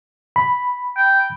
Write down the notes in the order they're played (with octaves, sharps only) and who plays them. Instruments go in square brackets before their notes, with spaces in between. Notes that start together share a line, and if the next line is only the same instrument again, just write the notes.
[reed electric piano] B5
[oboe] G5